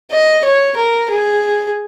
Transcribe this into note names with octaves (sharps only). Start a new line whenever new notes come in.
D#5
C#5
A#4
G#4